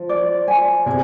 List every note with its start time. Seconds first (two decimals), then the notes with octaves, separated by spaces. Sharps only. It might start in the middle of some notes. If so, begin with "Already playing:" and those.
Already playing: F3
0.09 D5
0.48 G#5
0.86 C3 G#4